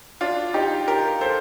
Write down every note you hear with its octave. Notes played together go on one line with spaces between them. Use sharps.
D4 F4
D#4 G4
G4 A#4
A4 C5